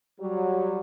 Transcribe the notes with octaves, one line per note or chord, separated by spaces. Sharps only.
F#3 G3